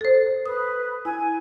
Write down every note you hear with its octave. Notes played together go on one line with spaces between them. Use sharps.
A4 C5
B4 D#6
E4 G#5